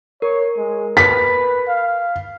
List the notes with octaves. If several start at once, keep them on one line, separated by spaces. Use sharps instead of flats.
A#4 C#5
G#3
B4 B6
F5